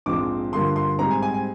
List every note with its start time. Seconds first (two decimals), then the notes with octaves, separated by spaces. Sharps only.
0.06 A#1 G#2 F3 G#3 C4 D6
0.53 G2 D3 F3 A#3 C6
0.76 C6
0.99 G#2 G3 C4 A#5
1.11 G#5
1.23 G#5
1.34 G#5